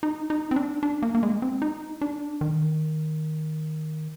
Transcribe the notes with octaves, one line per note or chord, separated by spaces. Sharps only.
D#4
D#4
C4
D4
D4
A#3
A#3
G#3
C4
D#4
D4
D#3